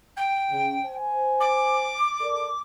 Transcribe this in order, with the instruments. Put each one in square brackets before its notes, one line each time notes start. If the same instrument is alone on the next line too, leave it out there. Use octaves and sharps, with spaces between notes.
[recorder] G5
[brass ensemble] C#3
C5 G#5
[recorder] D6
[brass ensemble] A4 A#4 D5